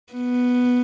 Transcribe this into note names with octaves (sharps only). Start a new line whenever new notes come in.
B3